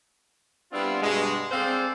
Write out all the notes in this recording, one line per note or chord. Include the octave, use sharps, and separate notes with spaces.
G3 B3 C4 D4 E4 F4
G2 B2 G3 G#3
C4 G#4 A4 C5 D5 F5